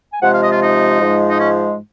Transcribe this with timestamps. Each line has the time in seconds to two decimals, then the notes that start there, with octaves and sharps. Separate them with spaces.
0.13 G#5
0.22 C3 F3 G#3 F#5
0.32 F5
0.41 D#5
0.51 F4
0.61 D#4
1.00 G#2 F3 G#3
1.28 D#4
1.38 C#4